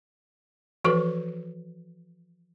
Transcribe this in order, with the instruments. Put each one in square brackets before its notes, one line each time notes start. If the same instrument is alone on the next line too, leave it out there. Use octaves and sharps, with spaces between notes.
[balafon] E3 F3 F#4 A4 B4